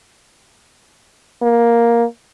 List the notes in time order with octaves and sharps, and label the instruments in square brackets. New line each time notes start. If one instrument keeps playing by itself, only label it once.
[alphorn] A#3